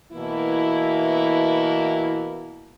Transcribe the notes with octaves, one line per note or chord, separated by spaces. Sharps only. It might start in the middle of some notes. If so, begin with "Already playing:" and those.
B2 E3 A#3 E4